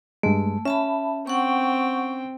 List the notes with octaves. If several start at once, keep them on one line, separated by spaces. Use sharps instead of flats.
G2 G#3 A3
C#4 E5 A5 B5
C4 F#5 G5 C#6